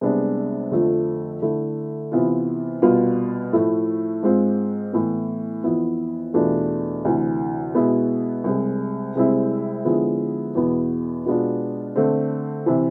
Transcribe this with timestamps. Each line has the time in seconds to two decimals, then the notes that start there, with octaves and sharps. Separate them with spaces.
0.01 C2 C3 G#3 B3 D4
0.71 F2 D3 F3 A3
1.42 D3 A3 E4
2.12 C3 E3 B3 F4
2.82 C2 B2 B3 F4
3.53 A2 F3 A3 E4
4.23 G#2 G#3 C4 F4
4.93 A2 E3 B3
5.64 F2 E3 B3 E4
6.34 E2 B2 A3 D4 F4
7.05 D2 C3 E3
7.74 B2 G#3 B3 E4
8.44 C2 C3 G#3
9.16 C2 C3 G#3 C4 E4
9.85 D3 F3 G#3 B3 E4
10.55 E2 B2 B3 E4
11.26 B2 G#3 B3 D4 F4
11.96 D3 A3 C4
12.66 C3 E3